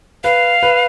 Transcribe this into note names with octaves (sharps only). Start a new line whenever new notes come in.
B4 F5
B4